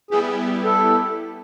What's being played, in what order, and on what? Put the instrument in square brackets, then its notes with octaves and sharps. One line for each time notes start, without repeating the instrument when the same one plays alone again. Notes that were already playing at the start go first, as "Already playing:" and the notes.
[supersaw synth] G3 B3 E4 G4 [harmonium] G#4
[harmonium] A4